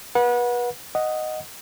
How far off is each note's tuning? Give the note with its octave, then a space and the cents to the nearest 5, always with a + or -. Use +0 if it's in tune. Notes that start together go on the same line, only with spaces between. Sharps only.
B4 -30 F#5 -25
D#5 +0 F#5 +0